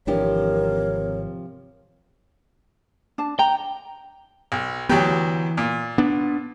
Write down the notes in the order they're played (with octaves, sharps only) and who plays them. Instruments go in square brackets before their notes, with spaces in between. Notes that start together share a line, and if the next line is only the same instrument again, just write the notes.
[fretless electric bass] G#1 E3 D4 [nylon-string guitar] C3 F3 G4 [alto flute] A#4 [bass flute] C#5
[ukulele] D4 A5
[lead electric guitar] G5 [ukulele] A#5
[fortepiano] B1
[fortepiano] D2 F#3 G4 [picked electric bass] E3 B3
[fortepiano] A#2
[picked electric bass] B3 D4